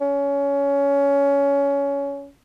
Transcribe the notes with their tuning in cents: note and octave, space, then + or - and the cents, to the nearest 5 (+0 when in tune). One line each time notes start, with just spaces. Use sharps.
C#4 +20